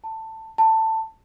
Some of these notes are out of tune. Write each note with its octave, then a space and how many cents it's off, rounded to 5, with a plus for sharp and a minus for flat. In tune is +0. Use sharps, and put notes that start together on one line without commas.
A5 +15
A5 +15